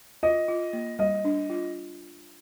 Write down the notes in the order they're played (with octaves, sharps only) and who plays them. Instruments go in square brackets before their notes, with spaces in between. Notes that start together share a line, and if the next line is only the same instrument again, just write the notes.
[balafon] F4 [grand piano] D#5
[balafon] F4
A#3
[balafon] G3 [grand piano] D#5
[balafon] D4
F4